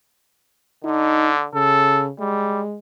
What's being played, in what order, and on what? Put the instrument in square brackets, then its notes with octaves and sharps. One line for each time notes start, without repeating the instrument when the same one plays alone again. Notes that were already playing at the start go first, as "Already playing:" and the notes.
[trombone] D3 [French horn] D#4
[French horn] C#3 [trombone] A4
[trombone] G3 [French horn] G#3